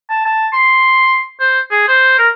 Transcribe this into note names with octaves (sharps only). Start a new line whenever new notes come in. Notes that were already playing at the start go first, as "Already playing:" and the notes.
A5
A5
C6
C5
G#4
C5
A#4